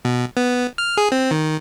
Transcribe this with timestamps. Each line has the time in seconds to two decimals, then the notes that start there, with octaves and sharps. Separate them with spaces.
0.05 B2
0.37 B3
0.78 F6
0.97 G#4
1.12 C4
1.31 D#3